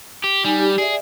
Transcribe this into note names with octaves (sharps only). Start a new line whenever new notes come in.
G4
G3 D#4 G#5
G4
G#4 D5 E5